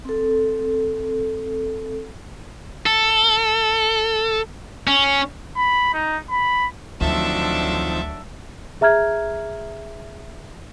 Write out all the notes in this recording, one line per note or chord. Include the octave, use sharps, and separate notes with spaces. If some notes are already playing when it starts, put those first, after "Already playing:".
C4 A4
A4
C#4
B5
D#4
B5
D2 D#3 F3 F#3 C4 D4 A4 E5
G#4 E5 A#5 F6 G#6